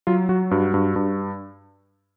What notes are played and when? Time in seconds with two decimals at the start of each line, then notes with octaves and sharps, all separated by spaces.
0.07 F#3 F4
0.29 F#3 F#4
0.51 G2 F#4
0.74 G2
0.96 G2